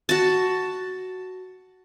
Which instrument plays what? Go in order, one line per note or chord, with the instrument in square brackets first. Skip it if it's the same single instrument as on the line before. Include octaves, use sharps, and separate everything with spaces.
[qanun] F#4 A5